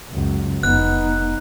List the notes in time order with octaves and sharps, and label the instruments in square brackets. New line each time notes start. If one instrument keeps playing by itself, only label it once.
[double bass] C#2 F#2
[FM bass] F1 [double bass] B3 D#4 [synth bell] F#6